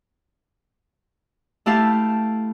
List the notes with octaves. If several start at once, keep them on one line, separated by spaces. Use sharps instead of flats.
A3 E4 G4 F5 A5